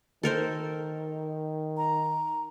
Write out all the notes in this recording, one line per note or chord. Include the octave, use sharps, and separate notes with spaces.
D#3 A4 A#4 C5
A#5